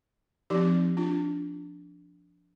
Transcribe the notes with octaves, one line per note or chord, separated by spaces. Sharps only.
F3 C4 D#4 G4
D4 F4